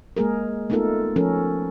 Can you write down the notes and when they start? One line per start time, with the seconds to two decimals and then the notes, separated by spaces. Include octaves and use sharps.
0.17 G#3 A#3 G#4 A#4
0.70 A3 B3 D#4 F4 A4 A#4
1.16 F3 C#4 A4 A#4